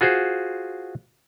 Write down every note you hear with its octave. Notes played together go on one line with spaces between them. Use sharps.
F4 F#4 G#4 C5